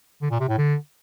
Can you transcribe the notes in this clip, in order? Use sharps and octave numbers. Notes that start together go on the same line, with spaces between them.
D3
A#2
C3
A2
D3